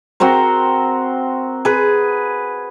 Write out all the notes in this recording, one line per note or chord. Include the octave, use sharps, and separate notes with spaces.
C4 F#4 A#4 C5
G#4 B4